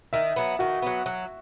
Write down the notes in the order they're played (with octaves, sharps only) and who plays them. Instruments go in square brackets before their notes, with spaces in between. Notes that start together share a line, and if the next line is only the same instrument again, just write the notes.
[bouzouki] D#3 [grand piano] E5
[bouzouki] F#3 B3
[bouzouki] D#3 [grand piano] F#4
[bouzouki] F#3 B3
F#3